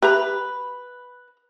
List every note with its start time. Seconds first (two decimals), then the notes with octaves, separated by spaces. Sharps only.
0.03 G4 B4 E5 A#5